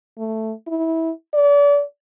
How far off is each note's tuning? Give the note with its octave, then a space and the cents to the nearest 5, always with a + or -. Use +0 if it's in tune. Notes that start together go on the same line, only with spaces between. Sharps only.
A3 +5
E4 -20
D5 -35